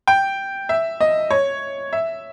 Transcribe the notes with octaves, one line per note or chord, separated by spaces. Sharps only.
G5
E5
D#5
C#5
E5